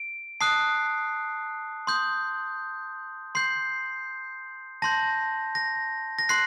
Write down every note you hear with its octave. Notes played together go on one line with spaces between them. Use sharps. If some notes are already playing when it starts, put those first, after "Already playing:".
Already playing: D7
A5 D#6 F#6 C7
C6 D#6 G6
C6 G6 C7
A5 C6 G6 A#6
A#6
A#6
C6 F#6 C7